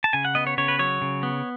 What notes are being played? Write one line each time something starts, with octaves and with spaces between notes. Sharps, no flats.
A5
C#3 G#5
F#5
B3 D#5
C#5
C#3 C#5
B4
F#3 C#5
C#3
B3